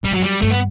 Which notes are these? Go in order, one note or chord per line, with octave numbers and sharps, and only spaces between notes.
F#2 G3
G2 F#3
F#2 G3
G2 A3
B3